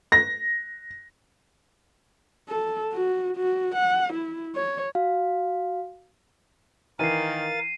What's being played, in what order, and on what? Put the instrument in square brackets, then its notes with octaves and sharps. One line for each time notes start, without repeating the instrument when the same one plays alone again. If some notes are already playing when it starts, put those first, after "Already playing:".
[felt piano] A#6
[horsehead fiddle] A4
F#4
F#4
F#5
E4
C#5
[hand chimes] F#4 F5
[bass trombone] D#3 [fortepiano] E3 [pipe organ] A#4 F5 A6 [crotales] C7 D#7